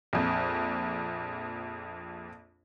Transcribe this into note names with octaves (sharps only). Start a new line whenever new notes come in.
A#1 F2